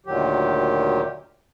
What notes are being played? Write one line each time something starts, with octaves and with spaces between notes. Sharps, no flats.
D2 A#2 D#3 F#3 G4